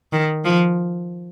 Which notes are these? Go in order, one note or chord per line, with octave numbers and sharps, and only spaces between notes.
D#3
F3